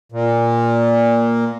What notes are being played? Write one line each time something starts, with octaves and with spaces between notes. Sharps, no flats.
A#2